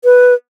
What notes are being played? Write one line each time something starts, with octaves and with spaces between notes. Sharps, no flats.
B4